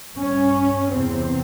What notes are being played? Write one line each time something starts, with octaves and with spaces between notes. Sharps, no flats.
G2 C#4
E2 C3 C4